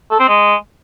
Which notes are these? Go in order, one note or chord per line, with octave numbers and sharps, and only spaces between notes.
A4
C4
G#3